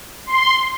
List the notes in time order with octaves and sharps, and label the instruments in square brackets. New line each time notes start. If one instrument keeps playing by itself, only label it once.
[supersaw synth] C6